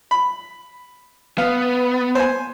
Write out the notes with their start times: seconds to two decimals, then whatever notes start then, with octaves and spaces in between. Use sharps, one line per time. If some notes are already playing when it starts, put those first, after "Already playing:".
0.11 B5
1.38 B3 F5
2.15 C5 G#5